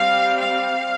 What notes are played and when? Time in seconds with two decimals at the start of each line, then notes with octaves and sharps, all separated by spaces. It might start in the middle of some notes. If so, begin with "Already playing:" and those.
Already playing: G3 C4 F5
0.39 F5